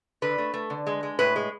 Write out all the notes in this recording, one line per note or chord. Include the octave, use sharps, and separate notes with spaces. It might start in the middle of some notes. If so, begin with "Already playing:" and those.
D3 B4
A3
A3
D3
G#3
G#3
A2 B4
G#3